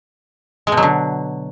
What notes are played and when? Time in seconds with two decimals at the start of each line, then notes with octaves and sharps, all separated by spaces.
0.67 G#3
0.72 B2
0.77 F#3
0.83 D3